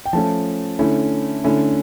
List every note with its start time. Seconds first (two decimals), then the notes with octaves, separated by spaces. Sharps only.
0.05 G5
0.13 F3 A3 C#4 A5
0.79 D3 A3 C#4 E4
1.44 D3 A3 C#4 E4